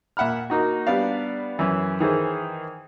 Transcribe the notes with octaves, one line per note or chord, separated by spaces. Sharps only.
A#2 E5 F#5 B5 F6
A#3 D#4 F#4
G3 B3 D4 D5 F5
F#2 E3
D#3 E3 G#4 C5